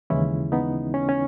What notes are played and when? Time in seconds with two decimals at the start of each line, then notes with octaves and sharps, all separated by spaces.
0.10 D#2 C#3 E3 G#3 C#4 E4
0.52 B3 D#4
0.94 C#4
1.09 C#4